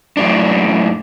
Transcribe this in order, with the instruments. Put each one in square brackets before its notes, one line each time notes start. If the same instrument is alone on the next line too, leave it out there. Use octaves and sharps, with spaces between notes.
[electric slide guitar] F#2 A2 D4